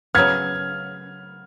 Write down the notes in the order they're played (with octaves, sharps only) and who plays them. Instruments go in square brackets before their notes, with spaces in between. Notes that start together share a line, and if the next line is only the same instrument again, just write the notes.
[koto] C#3 F#3 B3 [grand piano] F6 G#6